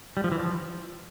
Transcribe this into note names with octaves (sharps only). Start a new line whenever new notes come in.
G3
F3
E3
F3